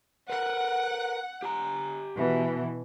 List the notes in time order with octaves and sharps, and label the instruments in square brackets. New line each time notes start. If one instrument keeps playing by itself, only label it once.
[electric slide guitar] A#4 B4 [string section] F#5
[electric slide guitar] G4 G#5 A#5
[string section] B2 E3